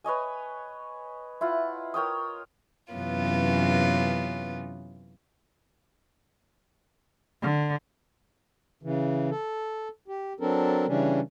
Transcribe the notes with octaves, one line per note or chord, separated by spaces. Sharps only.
B4 C#5 D#5 G#5
E4 F4 F#5
A#4 C#5 G5 D#6
F#2 C3 E3 B3 C#4 F4
D3
C#3 E3
A4
G4
F#3 C4 D4 A4 A#4
C#3 E3 G3 C#4 D4